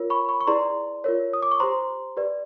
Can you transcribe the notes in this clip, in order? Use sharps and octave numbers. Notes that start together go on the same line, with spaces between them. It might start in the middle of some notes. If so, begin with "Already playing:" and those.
Already playing: F4 A#4 C#5
B5 C#6
B5 C#6
C#6
E4 G#4 B4 D5 A#5 C6
F4 A#4 C#5
D#6
D6
C#6
G4 C5 A#5 C6
G4 B4 D5